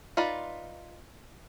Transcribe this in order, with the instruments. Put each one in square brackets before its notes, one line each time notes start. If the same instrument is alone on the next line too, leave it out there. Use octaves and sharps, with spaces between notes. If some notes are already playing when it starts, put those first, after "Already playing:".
[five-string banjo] D#4 F4 B4 D5 F5